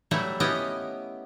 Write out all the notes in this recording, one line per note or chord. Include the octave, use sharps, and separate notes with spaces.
E3 F#3 G3 A3 E4
B3 C#4 E4 G4 D#5